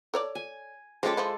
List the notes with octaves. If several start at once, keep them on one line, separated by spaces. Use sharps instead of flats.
A4 C#5 D5
G#5
F3 G#3 C#4 G4 A4 D6
F3 E4